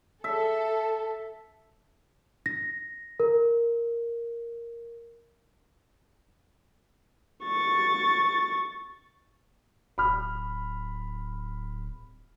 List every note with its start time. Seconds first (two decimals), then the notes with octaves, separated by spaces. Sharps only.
0.24 A4 E5 A5
2.46 A#6
3.20 A#4
7.45 C#6 A6
9.98 D1 B5 F6